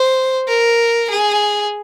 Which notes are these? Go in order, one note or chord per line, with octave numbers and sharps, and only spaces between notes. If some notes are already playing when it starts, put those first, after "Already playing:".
Already playing: C5
A#4
G#4